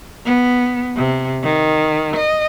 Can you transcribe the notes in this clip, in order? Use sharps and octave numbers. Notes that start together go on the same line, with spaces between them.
B3
C3
D#3
D#5